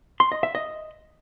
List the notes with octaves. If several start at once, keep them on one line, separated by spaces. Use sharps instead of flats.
C6
D#5
E5
D#5